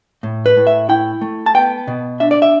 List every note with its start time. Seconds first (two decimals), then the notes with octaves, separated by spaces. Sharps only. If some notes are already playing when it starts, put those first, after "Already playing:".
0.23 A2
0.46 B4
0.57 A2
0.67 E5
0.89 E4 G5
1.21 A3
1.46 A5
1.54 B3 G5
1.87 B2
2.20 D4 E5
2.31 D5
2.42 E5